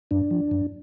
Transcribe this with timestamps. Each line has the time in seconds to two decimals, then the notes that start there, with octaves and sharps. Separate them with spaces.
0.11 F#2 D4
0.31 F3
0.51 F#2